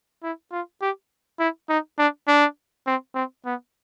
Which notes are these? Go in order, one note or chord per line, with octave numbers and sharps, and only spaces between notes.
E4
F4
G4
E4
D#4
D4
D4
C4
C4
B3